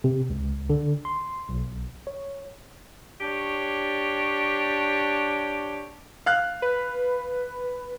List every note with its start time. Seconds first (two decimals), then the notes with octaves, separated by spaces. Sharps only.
0.04 C3
0.30 C#2
0.70 D3
1.05 C6
1.49 B1
2.07 C#5
3.21 D4 G4 C#5
6.26 F5 F#6
6.62 B4